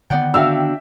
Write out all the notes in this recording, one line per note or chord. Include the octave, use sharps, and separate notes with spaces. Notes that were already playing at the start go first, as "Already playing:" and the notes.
D3 D#3 B3 D5 F#5 G5
D4 F#4 E5 F5 G5 E6 F6